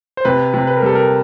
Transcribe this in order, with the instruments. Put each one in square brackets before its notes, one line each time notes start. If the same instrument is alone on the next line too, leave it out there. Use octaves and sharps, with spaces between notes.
[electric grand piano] C5
[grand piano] C3 [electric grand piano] B4
[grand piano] C3
[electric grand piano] B4
A#4
[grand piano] G3 [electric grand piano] A4
[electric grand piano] A#4